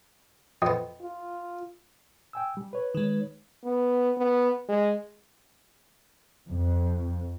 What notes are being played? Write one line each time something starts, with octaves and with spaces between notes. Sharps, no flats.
F2 B3 D#5 G5 D#6
F4
G5 G#5 E6
G3
B4 C#5
D#3 G#3
B3
B3
G#3
F2